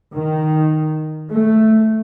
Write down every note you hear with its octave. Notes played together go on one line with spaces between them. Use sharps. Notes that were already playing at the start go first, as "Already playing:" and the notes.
D#3
A3